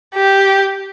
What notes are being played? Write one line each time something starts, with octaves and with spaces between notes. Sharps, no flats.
G4